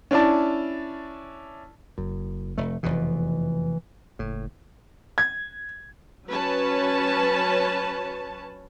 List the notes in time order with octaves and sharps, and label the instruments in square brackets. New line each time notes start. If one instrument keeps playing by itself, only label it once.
[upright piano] C#4 D4 E4 D5 A5
[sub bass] F#1 [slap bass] F#2
[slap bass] F1 A3
[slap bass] F1 E2 B2 [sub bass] E3
[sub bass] F#1 [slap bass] A2
[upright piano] G#6
[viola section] F#3 C#4 B4 C#5 A5